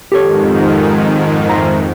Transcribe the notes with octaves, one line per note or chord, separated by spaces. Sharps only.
F2 G#2 D#3 G4 A4 C#5
C5 E5 A#5